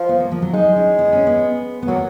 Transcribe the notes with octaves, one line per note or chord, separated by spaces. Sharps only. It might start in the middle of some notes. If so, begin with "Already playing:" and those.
Already playing: F3
B3
A#3
F3
F#3
G#3 D#4
C#4
B3
C#4
B3
B3
F#3 A#3